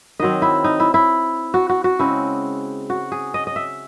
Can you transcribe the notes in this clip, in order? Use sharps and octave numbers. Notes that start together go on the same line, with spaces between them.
D#3 F#3 C4 D#5
E4
D#4
E4
E4
F#4
F#4
F#4
C#3 G#3 C4 E4
F#4
G#4
D#5
D#5
E5